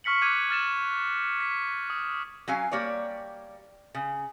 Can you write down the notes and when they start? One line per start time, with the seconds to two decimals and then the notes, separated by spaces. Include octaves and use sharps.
0.04 C#6 F6 B6 C#7 F#7
0.22 D6 F#6 G#6 D#7
0.50 F6 A6 E7 F#7
1.40 B6
1.90 D#6
2.48 F#3 C#4 F5 G#5
2.72 G3 A#3 C#5 D5
3.94 C#3